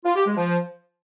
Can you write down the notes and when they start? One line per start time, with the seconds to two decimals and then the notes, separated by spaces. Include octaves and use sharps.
0.05 F4
0.16 G4
0.26 G#3
0.37 F3